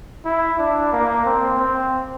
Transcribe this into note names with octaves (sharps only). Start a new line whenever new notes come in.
E4
D4
A#3
C4
C4